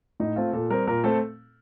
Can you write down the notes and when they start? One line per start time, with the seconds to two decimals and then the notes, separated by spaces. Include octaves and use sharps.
0.20 A2 D#4
0.36 A3 C4 F4
0.53 A#2 A4
0.70 G3 C4 A#4
0.87 A#2 A#4
1.04 A3 C4 A4